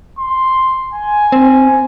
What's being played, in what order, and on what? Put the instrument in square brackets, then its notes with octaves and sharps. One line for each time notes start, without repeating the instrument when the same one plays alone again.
[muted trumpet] C6
G#5
[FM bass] C4